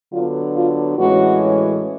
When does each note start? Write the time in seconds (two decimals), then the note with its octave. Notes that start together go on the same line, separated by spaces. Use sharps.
0.13 D3 F#3 B3 D4 F4
0.56 F4
0.99 A2 E3 G#3 C#4 F#4